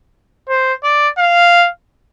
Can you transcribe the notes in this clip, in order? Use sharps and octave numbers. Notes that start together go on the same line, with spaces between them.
C5
D5
F5